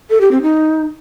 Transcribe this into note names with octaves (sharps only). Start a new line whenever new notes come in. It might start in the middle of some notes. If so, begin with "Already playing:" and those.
A4
G4
C4
D#4